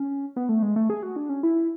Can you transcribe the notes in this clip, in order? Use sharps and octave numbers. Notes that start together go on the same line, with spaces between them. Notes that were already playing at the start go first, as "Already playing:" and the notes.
Already playing: C#4
B3
A3
G#3
A3
G#4
F#4
D4
C#4
E4